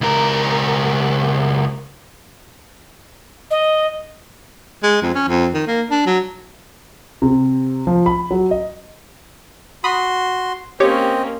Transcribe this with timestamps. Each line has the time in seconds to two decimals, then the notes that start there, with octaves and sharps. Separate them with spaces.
0.01 C#2 A#4
3.51 D#5
4.83 G#3
5.02 F2
5.15 C#4
5.28 F2
5.54 D#3
5.67 A#3
5.91 D4
6.06 F#3
7.22 C3
7.87 F3
8.06 B5
8.31 F#3
8.51 D#5
9.84 F#4 B5 C6 D#6
10.80 A#3 C4 C#4 G4 C#5 D#5 D6